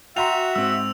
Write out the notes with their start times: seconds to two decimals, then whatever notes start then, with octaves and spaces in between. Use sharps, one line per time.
0.17 F#4 E5 G5 A#5 C6 F7
0.55 G#2 C4 E6